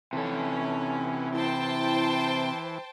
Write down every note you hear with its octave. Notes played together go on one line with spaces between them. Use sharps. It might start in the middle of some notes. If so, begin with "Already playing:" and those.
C3 E3 C#4 A4 A5
E4 C5 G5 A5